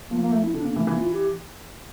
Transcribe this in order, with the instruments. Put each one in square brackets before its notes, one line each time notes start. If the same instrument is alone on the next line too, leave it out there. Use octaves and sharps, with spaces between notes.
[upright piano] F3 [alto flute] A#3
[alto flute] A#3
A3
E4
[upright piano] D3 [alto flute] D4
[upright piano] D3 [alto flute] A#3
[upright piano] E3 [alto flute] A3
[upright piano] E3 [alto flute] A#3
[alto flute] F4
G4